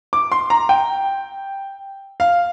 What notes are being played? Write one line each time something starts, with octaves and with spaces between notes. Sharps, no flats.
D6
C6
A#5
G5
F5